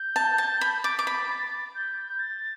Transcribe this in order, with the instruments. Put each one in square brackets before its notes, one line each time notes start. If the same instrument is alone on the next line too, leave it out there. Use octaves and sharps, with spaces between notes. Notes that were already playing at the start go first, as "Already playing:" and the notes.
Already playing: [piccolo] G6
[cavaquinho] A5
A5
B5
[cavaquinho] D6 [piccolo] A6
[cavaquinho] D6
B5
[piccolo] G6
A6